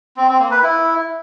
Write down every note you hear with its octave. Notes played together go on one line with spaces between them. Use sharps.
C4
C4
A#3
B4
E4